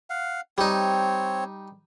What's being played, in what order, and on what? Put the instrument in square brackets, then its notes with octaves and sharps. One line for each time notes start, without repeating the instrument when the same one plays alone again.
[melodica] F5 F#5
[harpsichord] G3 D#4 [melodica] C4 C#5